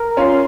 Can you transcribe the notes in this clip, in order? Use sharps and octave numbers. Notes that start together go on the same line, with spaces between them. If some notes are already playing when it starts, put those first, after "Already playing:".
Already playing: A#4
C#4 F4 C6